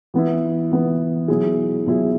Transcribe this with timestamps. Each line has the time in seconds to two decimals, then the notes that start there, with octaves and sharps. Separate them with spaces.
0.14 E3 B3 E4
0.72 E3 B3 E4
1.28 B2 F#3 E4 G#4
1.86 B2 F#3 E4 G#4